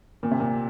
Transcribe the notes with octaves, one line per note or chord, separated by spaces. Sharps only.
A#2
C3
A#2